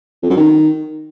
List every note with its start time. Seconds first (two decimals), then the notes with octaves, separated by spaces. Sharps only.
0.23 F2
0.30 F#2
0.37 D#3